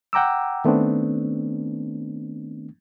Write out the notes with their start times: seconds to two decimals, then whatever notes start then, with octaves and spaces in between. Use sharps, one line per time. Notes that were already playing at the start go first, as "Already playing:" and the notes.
0.13 F#5 G5 A#5 D6 E6
0.65 D#3 A3 B3 C4 D4